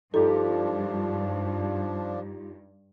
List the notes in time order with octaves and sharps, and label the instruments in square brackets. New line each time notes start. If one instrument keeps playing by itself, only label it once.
[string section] G2 [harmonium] F3 D4 [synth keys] D#4 F4 G4 [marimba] A4